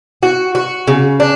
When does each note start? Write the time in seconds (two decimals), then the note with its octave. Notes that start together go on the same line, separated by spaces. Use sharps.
0.23 F#4
0.55 F#4
0.88 C#3
1.20 D4